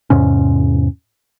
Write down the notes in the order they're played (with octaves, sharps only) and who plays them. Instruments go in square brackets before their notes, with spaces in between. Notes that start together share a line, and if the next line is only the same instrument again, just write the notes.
[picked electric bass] E2 G#2 C3 C#4